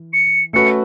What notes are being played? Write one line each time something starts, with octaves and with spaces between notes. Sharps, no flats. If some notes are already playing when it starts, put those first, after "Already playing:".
Already playing: E3
C#7
A3 C#4 F#4 B4 C#7